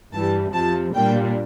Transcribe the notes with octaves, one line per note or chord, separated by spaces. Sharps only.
G2 E3 G3 A5
F2 C3 F3 A5
A#2 G3 A#3 D4 G5